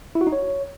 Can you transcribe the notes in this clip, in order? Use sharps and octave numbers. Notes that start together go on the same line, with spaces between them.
E4
F#4
D#4
C#5